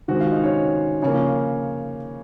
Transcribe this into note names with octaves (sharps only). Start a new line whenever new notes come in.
D#3 G#3 C4 F#4 F#5
F4 F5
D#4 D#5
C#4 C#5
C#3 F3 A#3 C#4 C#5